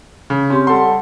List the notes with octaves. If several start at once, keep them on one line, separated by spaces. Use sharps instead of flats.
C#3
C4 C#4 G4 C6
G3 A4 F#5 C6